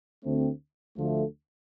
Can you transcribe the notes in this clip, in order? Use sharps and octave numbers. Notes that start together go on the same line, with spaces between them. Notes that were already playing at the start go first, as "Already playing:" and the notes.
D2 D3 A3 C4
D2 D3 F3 A3